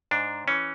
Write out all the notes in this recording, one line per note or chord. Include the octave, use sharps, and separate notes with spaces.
G#2 D4
E3 C#4